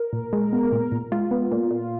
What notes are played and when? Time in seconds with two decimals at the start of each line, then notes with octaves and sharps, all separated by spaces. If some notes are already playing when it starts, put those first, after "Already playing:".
Already playing: A#4
0.13 A#2
0.33 G#3
0.53 B3
0.72 A#2
0.92 A#2
1.12 G#3 F4
1.31 B3
1.52 A#2
1.71 A#2